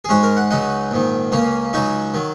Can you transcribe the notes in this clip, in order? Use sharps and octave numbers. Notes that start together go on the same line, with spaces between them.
G#4
G#2 G#3 C#4 F#4
A#4
F#5
C#2 C#3 F#3 D#4 F#5
A#1 G#2 D#3
C#2 C#3 A#3 C#4
C#2 C#3 F#3 D#4 F#4
D#3 F#3